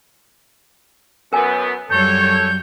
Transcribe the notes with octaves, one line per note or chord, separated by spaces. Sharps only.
F#2 B3 A#4 G#5
F#2 G3 A4 C#5 G6